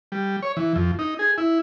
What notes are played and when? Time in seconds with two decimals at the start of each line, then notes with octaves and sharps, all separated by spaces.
0.12 G3
0.43 C#5
0.57 E3
0.76 F2
0.99 D#4
1.19 G#4
1.38 E4